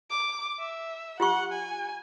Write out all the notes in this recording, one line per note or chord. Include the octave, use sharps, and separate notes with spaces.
D6
E5
F4 G4 F#5 C#6
G#5